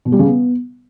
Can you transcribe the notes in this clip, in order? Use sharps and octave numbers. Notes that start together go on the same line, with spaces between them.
B2
G3
C#3
B3